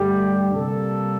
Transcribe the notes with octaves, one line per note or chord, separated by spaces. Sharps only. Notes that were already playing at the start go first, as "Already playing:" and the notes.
Already playing: G2 D3 A3 G4
C3 G3 A#3 A4